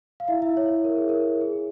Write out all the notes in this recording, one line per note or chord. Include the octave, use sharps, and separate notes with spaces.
F5
E4 E5
E4 E5
C#5
A#4
G#4
A#4
G#4